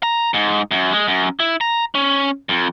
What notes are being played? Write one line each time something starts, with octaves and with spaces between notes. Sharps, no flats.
A#5
G#2
F#2
G#3
F#2
E4
A#5
C#4
F2